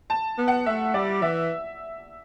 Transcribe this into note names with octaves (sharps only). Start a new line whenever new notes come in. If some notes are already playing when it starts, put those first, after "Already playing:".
A5
B3
F#5
A3 E5
G3 D5
E3 E5